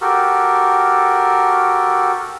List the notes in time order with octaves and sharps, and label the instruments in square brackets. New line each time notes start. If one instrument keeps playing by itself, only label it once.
[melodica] F#4 G4 A4 A#4